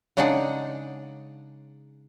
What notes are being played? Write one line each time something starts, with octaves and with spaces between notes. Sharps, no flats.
C#3 G#3 D4 D#4 G#4 F#5